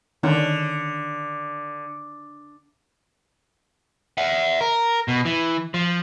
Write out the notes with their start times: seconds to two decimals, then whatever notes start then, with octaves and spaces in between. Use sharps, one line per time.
0.23 D3 D#3 C#4 D4
4.18 E5 F#5
4.61 A#4
5.08 B2
5.25 E3
5.74 F3